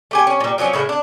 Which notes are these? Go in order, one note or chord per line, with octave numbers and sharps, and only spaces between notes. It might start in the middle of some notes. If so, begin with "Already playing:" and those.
A3 G4 G#5
C#4
A#2 G3
F3 F#3 C4 C#4
A2 C#3 E4
D4